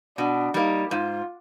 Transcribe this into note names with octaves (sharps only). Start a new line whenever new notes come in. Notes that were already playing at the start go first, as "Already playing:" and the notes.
B2 D4
G3 A#3 D#4
G#2 F4